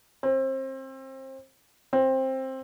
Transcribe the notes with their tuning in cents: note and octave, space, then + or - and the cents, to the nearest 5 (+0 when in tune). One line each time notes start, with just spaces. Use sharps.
C4 +30
C4 +15